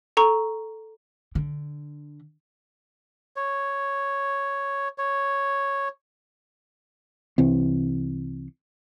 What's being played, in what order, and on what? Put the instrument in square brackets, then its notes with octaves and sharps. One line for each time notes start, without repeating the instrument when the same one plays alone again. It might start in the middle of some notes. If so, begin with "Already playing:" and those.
[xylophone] A4 A#5 C#6
[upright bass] D3
[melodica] C#5
C#5
[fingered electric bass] C2 C3 E3 C4